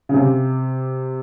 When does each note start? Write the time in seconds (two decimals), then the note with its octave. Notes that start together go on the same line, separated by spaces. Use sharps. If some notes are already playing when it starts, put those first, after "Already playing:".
0.09 C#3
0.14 C3